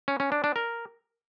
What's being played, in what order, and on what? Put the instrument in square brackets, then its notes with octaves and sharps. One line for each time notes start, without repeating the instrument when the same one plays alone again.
[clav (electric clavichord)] C#4
C#4
D4
D4
A#4